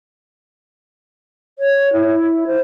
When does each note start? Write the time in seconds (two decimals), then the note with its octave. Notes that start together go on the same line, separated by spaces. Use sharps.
1.59 C#5
1.93 E4
2.47 C5